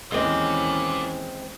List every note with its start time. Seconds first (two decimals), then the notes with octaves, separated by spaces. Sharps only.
0.12 D#2 E3 G#3 C4 C#4 F4 D5